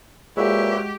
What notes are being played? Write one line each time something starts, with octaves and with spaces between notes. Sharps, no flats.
A#2 G#3 F#4 G4 B4 C#5 E5